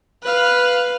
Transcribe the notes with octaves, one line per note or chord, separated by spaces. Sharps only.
B4 F5